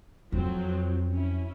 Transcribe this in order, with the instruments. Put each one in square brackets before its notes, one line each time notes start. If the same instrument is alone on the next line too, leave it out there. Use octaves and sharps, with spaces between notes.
[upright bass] F2 [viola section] F3 F#3 C4
[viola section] C#4 E4